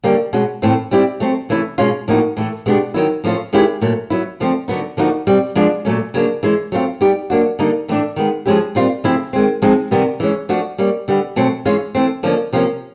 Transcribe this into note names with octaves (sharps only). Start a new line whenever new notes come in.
D3 G3 A#3 C#4
B2 G#3 C#4 F#4
A2 E3 A3 C4
G3 C4 E4 G4
F#3 A3 C4
C3 E3 A3 C#4 E4
B2 G#3 C#4 F4
A2 F3 A#3 D#4 F#4
A2 E3 A3
B2 G#3 B3 D4 G4
D#3 F#3 B3 E4
A2 F3 A3 C#4 F4
D#3 G#3 C#4 E4 G4
A#2 F#3 A3
F#3 B3 E4
D3 F3 A3 C4
D3 F#3 B3 D#4
D3 F3 A#3 D#4 F#4
B2 G3 C4
F3 G#3 B3 D4 F4
A#2 F#3 A3 C#4
C#3 F#3 A#3 D4
E3 G#3 C#4 E4
F#3 A3 C4 F4
G3 B3 D#4 G4
F#3 A#3 D4 F#4
D3 G3 A#3 D#4
A2 E3 A3 D4
D#3 G#3 B3
F3 G#3 C#4 E4 G4
A#2 G3 C4 F4
C#3 F3 A3 C4 E4
D#3 G#3 C4
F3 G#3 C4 D#4
C3 D#3 G3 B3
E3 G#3 C#4
F3 A3 D4 F#4
G3 A#3 C#4
D3 G3 B3
B2 F#3 A3 C4
E3 G#3 C#4 F4
E3 A3 C4
D3 F3 A#3 C#4
C3 F3 A#3 C#4